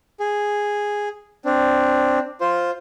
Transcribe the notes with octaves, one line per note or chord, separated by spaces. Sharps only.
G#4
C4 D4
F4 C5